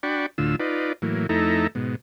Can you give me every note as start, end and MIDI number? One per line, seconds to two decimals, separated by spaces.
0.03 0.26 62
0.03 0.26 66
0.03 0.26 74
0.03 0.26 79
0.03 0.26 83
0.03 0.26 85
0.38 0.56 38
0.38 0.56 45
0.38 0.56 50
0.38 0.56 65
0.38 0.56 88
0.60 0.93 63
0.60 0.93 65
0.60 0.93 71
0.60 0.93 74
1.02 1.27 45
1.02 1.27 52
1.02 1.27 54
1.02 1.27 58
1.29 1.67 41
1.29 1.67 57
1.29 1.67 63
1.29 1.67 64
1.29 1.67 69
1.29 1.67 82
1.75 1.96 44
1.75 1.96 47